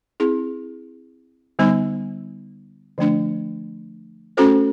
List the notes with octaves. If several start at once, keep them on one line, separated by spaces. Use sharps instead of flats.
C4 E4 G#4
D3 G3 B3 D#4
D3 F3 A3 D4
A3 C#4 F#4 A4 C5